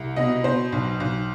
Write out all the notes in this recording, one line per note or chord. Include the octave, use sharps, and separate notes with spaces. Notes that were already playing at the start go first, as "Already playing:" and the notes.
Already playing: C2
B2 D#5
B2 C5
B1
B1